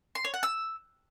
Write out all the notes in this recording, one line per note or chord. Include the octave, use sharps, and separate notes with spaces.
C6
C#5
F#5
E6